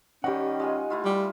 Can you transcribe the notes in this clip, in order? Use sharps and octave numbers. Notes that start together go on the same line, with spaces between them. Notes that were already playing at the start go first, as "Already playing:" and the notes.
D#3 G3 C#4 G4 F#5
G#3 F4 G#4
A3 E4 F4
G3